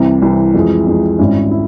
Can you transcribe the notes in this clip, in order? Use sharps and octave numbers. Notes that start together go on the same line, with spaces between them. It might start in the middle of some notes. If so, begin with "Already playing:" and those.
Already playing: C2 C3 E3
C2 C3 E3
F2 E3 G#3
F2 E3 G#3
G#1 G#2 G3 C#4 E4
E4